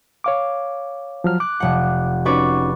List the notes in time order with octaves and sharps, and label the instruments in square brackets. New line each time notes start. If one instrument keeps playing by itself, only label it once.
[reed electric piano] C#5 F5 D6
F3 F#3 F6
[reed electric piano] D6 [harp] F#6
[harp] F1 F#5
[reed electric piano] C#4 D#4 F#4 [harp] B4 D5 C#6